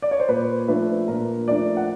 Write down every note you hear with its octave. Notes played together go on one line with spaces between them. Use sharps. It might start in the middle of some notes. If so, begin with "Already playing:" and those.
D5
C#5
C5
A#2 B4
F3 A3 D4 B4
A#2 A#4
F3 A3 D4 D5
F#5